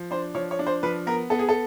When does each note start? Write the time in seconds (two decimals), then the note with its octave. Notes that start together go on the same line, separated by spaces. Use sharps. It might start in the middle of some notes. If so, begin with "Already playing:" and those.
Already playing: F3
0.11 D4 C5
0.35 F3 C#5
0.51 C#5
0.59 D4
0.67 C5
0.83 F3 B4
1.07 B3 A#4
1.30 B3 A4
1.39 G#4
1.49 A4